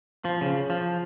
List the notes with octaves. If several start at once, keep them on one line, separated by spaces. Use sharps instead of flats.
F3
C#3
F3